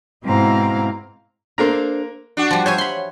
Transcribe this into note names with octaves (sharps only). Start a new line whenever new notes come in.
G#2 B2 C4 E4 F5 A#5
A#3 D4 A4 A#4 C5 A#5
D4 F#4
F3 G3
C5 C#5 E5 G#5
B5 C6